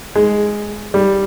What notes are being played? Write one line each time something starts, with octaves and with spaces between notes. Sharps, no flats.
G#3
G3